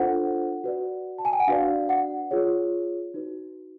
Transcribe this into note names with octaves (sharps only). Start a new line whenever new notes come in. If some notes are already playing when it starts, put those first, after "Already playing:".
Already playing: D4 F4 A4 C5 F#5
F#4 B4 D5
A5
G#5
G5
F#5
D4 F#4 B4 D5 F5
F#5
F4 G#4 C#5
D#4 F#4 B4